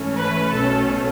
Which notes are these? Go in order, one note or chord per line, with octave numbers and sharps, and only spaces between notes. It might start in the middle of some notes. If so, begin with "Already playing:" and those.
Already playing: G#2 E3 A3 C#4
B4
B1 B2 A3 C#4 A4